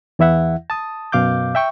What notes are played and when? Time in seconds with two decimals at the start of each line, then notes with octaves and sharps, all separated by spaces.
0.19 E2 E3 E4 E5 F#5
0.70 A5 D#6
1.12 F#2 B2 F5 D6 G6
1.55 E5 G5 C#6